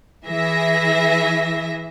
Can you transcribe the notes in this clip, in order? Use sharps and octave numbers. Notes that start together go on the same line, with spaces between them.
E3 G#4 E5 A#6